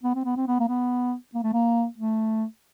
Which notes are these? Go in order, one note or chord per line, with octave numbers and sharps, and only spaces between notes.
B3
C4
B3
C4
B3
A#3
B3
A#3
A3
A#3
A3